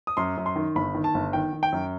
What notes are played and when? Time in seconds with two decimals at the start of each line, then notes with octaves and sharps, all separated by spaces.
0.07 D#6
0.17 F#2 C6
0.37 F#2
0.46 C6
0.56 D#3
0.75 G1 B5
0.94 D#3
1.04 A5
1.14 G1
1.33 D#3 G5
1.53 D#3
1.63 G5
1.72 F#2